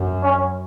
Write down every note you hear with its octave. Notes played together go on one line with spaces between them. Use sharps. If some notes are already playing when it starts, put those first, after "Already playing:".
Already playing: F#2
C#4